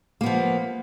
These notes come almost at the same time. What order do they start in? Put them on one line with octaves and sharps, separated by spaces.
A#3 B3 F3